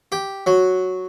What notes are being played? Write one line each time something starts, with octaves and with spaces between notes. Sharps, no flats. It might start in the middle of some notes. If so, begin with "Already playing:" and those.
G4
F#3